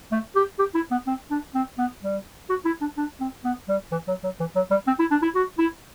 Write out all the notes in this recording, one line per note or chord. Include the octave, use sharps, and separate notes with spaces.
A3
G4
G4
E4
B3
C4
D4
C4
B3
G3
F#4
E4
D4
D4
C4
B3
G3
E3
F#3
F#3
E3
F#3
G3
C4
E4
D4
E4
F#4
E4